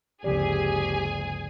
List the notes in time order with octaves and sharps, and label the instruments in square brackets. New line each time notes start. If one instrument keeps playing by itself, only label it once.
[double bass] G1 D2 [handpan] C#3 F3 D5 [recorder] G4 [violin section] G#4 G#5